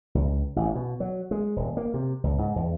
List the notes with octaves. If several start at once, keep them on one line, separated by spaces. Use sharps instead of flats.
C#2
A1
B2
F#3
G#3
D#1
A#3
C3
C#2
G#2
E2